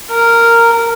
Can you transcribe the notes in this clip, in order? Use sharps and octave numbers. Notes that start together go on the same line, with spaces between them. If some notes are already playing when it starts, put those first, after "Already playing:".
A#4